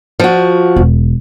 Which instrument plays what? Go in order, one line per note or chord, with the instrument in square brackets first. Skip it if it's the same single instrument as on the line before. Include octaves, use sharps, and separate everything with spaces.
[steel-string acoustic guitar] F3 F#4
[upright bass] E1